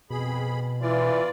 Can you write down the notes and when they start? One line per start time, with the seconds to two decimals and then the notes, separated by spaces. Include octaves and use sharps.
0.10 F2 B2 G#4 B5
0.81 E3 F4 D5